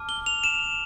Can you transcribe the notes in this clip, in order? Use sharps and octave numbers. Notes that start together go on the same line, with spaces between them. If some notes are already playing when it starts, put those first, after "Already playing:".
Already playing: A5 D6 F6
G7
F7
E7